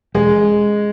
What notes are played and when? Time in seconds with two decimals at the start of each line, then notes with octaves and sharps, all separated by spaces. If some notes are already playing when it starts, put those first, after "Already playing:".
0.14 E1 G#3